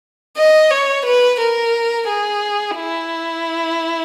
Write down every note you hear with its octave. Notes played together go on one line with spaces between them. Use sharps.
D#5
C#5
B4
A#4
G#4
E4